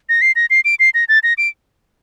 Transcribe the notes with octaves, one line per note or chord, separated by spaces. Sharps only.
A#6
C7
A#6
C7
D7
C7
A#6
A6
A#6
D7